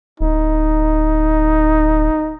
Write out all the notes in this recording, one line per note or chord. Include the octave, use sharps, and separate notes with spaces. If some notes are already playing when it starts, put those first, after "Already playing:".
D1 D#4